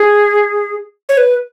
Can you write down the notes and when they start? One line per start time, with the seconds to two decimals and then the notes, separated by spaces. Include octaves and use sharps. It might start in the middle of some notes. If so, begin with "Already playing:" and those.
Already playing: G#4
1.09 C#5
1.17 B4